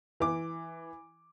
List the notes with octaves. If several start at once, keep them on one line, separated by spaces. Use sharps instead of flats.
E3 D6